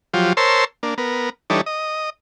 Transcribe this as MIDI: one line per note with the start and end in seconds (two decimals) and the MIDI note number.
0.14 0.33 53
0.14 0.33 54
0.14 0.33 65
0.14 0.33 67
0.37 0.65 70
0.37 0.65 72
0.37 0.65 73
0.37 0.65 81
0.37 0.65 84
0.37 0.65 88
0.83 0.94 58
0.83 0.94 62
0.98 1.30 59
0.98 1.30 70
1.50 1.61 52
1.50 1.61 55
1.50 1.61 62
1.50 1.61 63
1.50 1.61 69
1.50 1.61 73
1.66 2.10 75